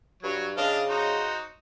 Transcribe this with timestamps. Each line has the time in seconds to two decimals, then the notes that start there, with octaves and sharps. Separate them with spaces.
0.23 G2 F#3 C#5
0.57 C#3 D4 D#5 F5
0.88 D#4 F#4 C5